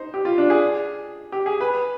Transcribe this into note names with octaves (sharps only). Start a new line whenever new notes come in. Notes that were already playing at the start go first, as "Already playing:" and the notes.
Already playing: D#4 C5
G4
F4
D4
G#4
G4
G#4
B4